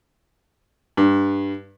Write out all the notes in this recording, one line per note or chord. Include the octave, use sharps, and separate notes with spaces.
G2